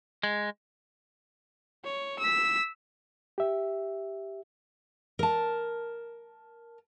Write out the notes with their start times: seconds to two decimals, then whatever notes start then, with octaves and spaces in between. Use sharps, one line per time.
0.23 G#3
1.85 C#5
2.19 E6 B6
3.38 G4 E5
5.19 A#4 A5